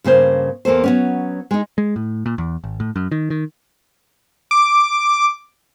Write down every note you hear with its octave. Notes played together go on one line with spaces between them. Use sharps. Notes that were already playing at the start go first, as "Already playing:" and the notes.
G2 C#3 A#3 C5
E2 A#3 A4 C5
F#3 B3 C#4
G#3 D#4
G#3
A2
A#2
E2
G#1
A2
F#2
D#3
D#3
D6